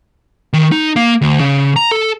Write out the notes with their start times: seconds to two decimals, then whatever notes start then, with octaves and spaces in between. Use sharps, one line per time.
0.53 D#3
0.72 D#4
0.96 A#3
1.22 D2
1.40 C#3
1.76 A#5
1.91 A4